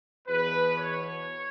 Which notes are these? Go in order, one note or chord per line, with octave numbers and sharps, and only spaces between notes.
E2 B2 B4
C#5